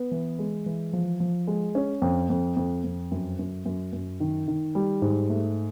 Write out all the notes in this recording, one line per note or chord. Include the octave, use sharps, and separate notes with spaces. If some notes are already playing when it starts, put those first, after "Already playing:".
Already playing: B3
E3
G#3
E3
F3
F3
G#3
C#4
F2
F2
F2
F2
F#2
F#2
F#2
F#2
D#3
D#3
G3
G#2
A3